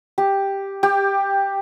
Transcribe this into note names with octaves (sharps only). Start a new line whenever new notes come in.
G4
G4